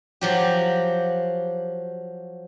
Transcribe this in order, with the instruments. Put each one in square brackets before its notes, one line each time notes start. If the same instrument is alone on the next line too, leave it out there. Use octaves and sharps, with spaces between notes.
[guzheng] F3 F#3 G4